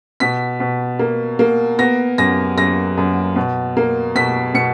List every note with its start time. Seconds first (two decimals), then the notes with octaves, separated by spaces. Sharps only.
0.20 B2 B6
0.60 B2
0.99 A#3
1.39 A#3
1.79 B3 A#6
2.18 F#2 A#6
2.57 F#2 A#6
2.97 F#2
3.36 B2
3.77 A#3
4.15 B2 B6
4.54 B2 C#7